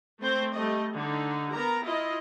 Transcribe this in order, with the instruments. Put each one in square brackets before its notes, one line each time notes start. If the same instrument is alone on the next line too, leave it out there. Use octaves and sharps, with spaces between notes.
[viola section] A3 C4 C5
G3 A3 D#5
D3 D#4
B3 A#4 A#5
E4 F4 D#5